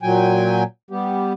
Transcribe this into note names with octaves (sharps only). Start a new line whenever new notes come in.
A#2 F#3 G5 G#5
G3 B3 G4